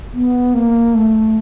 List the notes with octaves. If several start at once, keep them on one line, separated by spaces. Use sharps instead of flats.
B3
A#3
A3